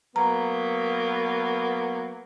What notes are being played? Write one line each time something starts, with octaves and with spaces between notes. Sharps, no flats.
F#3 A#3 B3 A#5